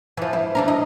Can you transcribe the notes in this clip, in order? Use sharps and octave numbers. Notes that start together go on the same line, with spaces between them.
E3 F3
E4
E3 D4 A#4
D#5